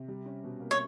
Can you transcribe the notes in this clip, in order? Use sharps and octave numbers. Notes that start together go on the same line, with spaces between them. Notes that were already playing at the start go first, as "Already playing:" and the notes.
Already playing: C3
G3
C#4
B2
A#3
C#5